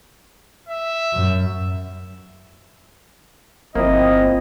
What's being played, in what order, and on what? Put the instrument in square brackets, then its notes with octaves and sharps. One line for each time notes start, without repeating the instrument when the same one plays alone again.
[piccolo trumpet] E5
[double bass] F#2
[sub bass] G1 [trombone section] F3 C4 [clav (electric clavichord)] A#3 E4 [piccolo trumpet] D#5